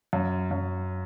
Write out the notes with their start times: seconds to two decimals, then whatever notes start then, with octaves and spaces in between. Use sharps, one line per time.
0.13 F#2
0.51 F#2